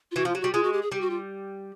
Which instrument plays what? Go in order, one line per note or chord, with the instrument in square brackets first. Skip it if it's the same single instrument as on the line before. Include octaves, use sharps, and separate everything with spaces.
[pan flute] F4
[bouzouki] E3 [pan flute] F#4
[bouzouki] F3
[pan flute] F4
[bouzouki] F#3 [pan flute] G4
[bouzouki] G3 [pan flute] F#4
[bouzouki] G#3 [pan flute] F4
[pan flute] F#4
G4
G#4
[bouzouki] G3 [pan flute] G4
[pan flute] F#4
F4